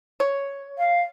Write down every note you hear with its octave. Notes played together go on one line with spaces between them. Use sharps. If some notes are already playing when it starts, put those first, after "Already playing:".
C#5
F5